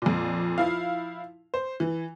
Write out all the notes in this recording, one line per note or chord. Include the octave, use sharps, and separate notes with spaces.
F2 A#2
F3 E4 F5
C5
E3